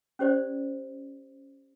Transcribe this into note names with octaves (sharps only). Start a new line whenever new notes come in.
C#4 G4 C5 D5